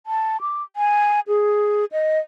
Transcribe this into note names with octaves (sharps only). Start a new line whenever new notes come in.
A5
D6
G#5
G#4
D#5